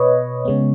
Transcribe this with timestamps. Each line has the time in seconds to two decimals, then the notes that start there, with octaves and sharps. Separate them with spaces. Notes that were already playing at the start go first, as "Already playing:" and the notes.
Already playing: B2 B4 C#5 D#5
0.45 C#3 G#3 B3